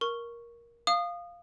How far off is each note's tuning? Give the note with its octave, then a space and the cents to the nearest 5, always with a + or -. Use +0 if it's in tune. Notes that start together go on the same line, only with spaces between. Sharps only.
A#4 +10 C#6 +0
F5 +0 D#6 -25